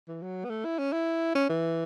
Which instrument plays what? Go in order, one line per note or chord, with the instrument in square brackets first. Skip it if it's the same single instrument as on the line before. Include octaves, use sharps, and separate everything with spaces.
[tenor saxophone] E3
F#3
B3
A3
E4
C#4
E4
C#4
E3